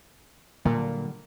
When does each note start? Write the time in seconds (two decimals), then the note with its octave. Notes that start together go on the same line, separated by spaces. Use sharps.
0.65 A#2 D3 F#3 G3